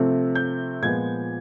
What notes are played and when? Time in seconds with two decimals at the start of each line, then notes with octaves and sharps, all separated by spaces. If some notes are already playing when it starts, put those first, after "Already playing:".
Already playing: C3 F3 A3 C4
0.35 G6
0.82 A#2 F3 G#3 B3 G#6